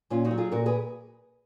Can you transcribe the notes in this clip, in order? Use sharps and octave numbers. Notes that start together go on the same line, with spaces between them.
A#2 C#4 F4
D#4 F#4
F#3
F4 G#4
A#2 F#4 A#4
G#4 B4